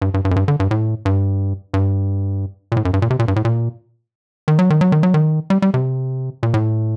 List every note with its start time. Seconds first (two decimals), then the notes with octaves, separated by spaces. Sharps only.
0.02 G2
0.14 G2
0.25 G2
0.31 F#2
0.36 G2
0.48 D3
0.60 G2
0.71 A2
1.05 G2
1.74 G2
2.72 A#2
2.77 A2
2.85 F#2
2.94 G2
3.02 A#2
3.10 C3
3.19 A#2
3.28 G2
3.36 A2
3.45 A#2
4.48 D#3
4.59 F#3
4.70 D#3
4.81 F#3
4.92 D#3
5.03 F#3
5.14 D#3
5.50 G3
5.62 G3
5.74 C3
6.43 A#2
6.54 A2